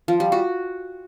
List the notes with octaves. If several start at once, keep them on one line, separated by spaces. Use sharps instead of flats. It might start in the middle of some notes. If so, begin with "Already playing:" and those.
F3
G3
F#4